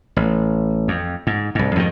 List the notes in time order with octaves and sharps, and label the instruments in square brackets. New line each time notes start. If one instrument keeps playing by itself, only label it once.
[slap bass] A1
F2
G#2
C2 G#2
F2 G#2 C3 D#3